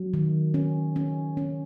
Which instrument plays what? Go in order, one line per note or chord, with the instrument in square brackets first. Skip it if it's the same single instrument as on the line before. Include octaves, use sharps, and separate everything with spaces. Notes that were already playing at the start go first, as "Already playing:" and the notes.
Already playing: [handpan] F#3
D#3
C#4
C#4
C#4